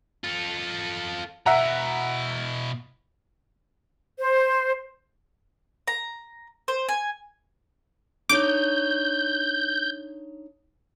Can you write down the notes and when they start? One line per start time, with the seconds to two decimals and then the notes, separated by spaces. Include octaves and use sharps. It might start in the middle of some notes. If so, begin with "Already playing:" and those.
0.24 F4 A4
1.46 B2 E4 E5 F#5 A#5
4.18 C5
5.88 A#5
6.68 C5
6.89 G#5
8.29 D4 D#4 C#5 D6 G6